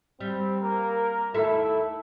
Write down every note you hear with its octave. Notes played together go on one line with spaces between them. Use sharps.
G3 C4
A#3 A#4
D#2 A3 E4 A4 E5